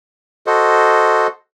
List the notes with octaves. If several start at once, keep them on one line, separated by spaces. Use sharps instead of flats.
F#4 A4 C5 D#5